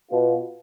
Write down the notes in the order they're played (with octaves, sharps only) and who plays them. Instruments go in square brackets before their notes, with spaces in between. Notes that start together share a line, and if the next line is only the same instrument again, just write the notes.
[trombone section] B2 B3 F4